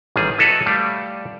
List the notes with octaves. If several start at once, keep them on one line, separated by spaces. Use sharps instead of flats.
A1 D#3 G3 G#4
E4 F#4 A4 B4 C#5 D#5
G3 A3 D5 F5